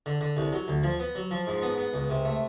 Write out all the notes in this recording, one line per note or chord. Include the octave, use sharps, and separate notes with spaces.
D3
D3
C2
F#3
D2
F3
B3
F#3
F3
G#2
B3
B3
C#2
C3
A3